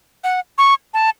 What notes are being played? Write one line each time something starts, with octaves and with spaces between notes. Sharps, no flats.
F#5
C#6
A5